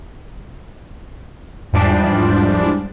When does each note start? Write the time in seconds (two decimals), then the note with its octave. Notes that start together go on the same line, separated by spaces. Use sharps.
1.73 E2 G#2 F3 G3 D4